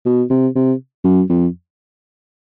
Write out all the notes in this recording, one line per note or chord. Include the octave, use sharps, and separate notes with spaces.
B2
C3
C3
F#2
F2